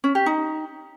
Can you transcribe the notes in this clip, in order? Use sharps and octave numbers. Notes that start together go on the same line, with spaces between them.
C#4
G4
D#4